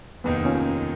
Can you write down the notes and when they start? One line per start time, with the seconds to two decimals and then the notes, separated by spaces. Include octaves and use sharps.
0.24 F1 D#2 D#3 A#3 B3 D#4
0.45 C#4 F4